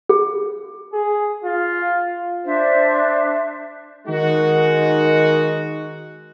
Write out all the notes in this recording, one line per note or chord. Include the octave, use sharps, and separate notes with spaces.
G#4
G#4
F4
D4 C5 E5
D#3 G#3 D#4 F#4